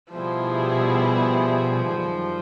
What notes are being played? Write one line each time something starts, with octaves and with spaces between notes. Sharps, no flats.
B2 F3 G3 B3 E4 G#4
F#2 D#3 G3